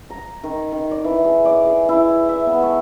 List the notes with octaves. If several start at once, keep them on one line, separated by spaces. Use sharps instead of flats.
A#5
D#3
D#3
D5
E3
G#4
D5
G#4
E4
E5
B3
A3